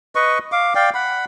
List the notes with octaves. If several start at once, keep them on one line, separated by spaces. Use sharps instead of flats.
B4 D#5 C#6
F5 D6
D5 F5 G5
F#5 B5